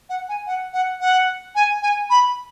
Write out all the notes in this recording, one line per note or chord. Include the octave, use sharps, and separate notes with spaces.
F#5
G#5
F#5
F#5
F#5
G#5
G#5
B5